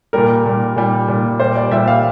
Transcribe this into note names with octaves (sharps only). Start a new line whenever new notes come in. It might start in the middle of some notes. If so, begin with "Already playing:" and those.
A#2 G3 A#4
A#2 G3
A#2 G3
A#2 G3
A#2 G3 C5
D5
A#2 G3 E5
F5